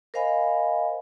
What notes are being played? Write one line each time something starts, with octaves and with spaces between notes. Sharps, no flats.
A#4 C5 D#5 F5 G#5 B5